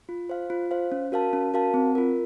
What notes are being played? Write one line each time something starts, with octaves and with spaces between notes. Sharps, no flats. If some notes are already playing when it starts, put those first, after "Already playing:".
F4
C5 F5
F4
C5 F5
C#4
F#4 A#4 F5 A5
C#4
F#4 A#4 F5 A5
C4
F4 A#4